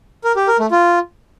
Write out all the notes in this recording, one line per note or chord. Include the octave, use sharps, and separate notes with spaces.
A#4
G4
A#4
A3
F4